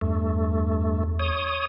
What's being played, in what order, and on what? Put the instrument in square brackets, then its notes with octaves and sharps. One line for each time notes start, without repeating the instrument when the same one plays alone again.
[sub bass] E2 [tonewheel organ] G2 A3
[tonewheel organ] C#5 D#6